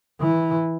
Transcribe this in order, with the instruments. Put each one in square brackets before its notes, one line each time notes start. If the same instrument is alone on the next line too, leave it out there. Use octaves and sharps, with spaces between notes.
[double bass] E3